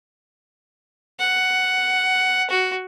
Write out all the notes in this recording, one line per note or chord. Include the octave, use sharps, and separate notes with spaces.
F#5
F#4